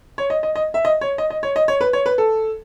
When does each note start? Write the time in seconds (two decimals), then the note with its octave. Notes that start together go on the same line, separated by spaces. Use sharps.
0.18 C#5
0.30 D#5
0.43 D#5
0.56 D#5
0.74 E5
0.85 D#5
1.01 C#5
1.18 D#5
1.30 D#5
1.43 C#5
1.56 D#5
1.68 C#5
1.81 B4
1.93 C#5
2.06 B4
2.18 A4